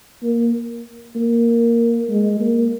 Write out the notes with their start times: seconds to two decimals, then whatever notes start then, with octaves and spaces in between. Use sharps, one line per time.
0.23 A#3
1.15 A#3
2.09 G#3
2.40 A#3